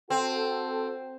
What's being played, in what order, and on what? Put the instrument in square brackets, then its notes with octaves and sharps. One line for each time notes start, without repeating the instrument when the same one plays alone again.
[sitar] C4 [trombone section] F#4 A4